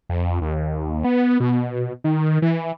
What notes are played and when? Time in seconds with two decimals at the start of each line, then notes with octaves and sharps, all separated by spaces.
0.09 F2
0.41 D#2
1.04 B3
1.40 B2
2.04 D#3
2.42 E3